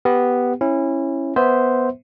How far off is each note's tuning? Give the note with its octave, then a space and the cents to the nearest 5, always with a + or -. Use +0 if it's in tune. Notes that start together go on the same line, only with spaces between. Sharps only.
B3 +0 G4 +0
C#4 -25 E4 +0
B3 +0 C5 -5 E5 -10